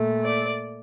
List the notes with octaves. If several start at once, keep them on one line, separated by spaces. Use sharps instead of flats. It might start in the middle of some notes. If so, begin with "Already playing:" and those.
Already playing: A#2 A3
D5